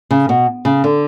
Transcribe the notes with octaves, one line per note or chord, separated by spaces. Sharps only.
C#3
B2
C#3
D3